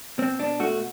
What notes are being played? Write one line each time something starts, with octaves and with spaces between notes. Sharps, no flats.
B2 C4
B2 D4
A3 F#4